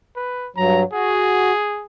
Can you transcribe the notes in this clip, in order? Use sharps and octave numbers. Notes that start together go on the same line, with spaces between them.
B4
G2 F#3 A#5
F#4 G#4